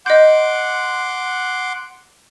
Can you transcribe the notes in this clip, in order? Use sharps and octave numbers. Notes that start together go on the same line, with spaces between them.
D#5 F#5 C6 D6 G6